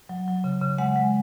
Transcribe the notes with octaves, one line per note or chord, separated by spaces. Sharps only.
F#3
F#3
C#3
C#3
G#3 F#5
G#3